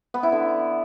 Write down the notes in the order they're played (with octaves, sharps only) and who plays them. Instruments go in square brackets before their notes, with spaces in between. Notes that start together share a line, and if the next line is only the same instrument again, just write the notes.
[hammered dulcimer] B3
E4
D3